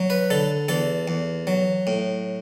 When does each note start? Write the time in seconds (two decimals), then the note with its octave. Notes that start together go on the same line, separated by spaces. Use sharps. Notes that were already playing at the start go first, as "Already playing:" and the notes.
Already playing: F#3
0.10 B4
0.30 D3 A4
0.68 E2 A4
1.08 E2
1.47 F#3
1.87 A2